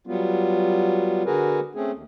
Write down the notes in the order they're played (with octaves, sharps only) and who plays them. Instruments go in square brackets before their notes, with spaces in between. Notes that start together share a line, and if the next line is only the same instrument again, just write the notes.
[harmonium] F#3 G3 B3 F4
D3 F#4 G#4 A#4 B4
A3 C4 C#4 G#4
D#2